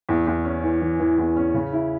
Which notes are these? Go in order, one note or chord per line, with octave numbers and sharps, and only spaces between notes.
E2
E2
C#4
E3
E3
E3
E2
C#4
C#3
E4